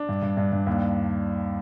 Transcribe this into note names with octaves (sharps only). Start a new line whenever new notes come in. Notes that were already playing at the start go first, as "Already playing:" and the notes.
Already playing: D4
G2
G2
G2
G2
D#2